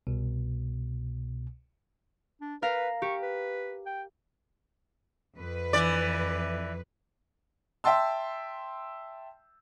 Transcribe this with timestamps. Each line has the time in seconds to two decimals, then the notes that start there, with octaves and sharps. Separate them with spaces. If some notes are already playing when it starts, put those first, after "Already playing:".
0.07 C2 B2
2.41 D4
2.62 A#4 B4 F5 A#6
3.02 G4 C#6
3.22 B4
3.86 G5
5.40 F2 B4
5.73 E3 D5
7.84 E5 G5 A5 C6 E6